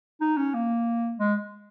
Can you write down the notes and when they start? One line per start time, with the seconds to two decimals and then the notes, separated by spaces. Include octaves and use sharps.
0.21 D#4
0.37 C#4
0.54 A#3
1.19 G#3